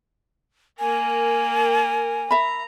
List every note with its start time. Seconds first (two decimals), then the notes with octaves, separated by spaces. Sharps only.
0.79 A#3 A#4 G#5
2.31 E5 A#5 B5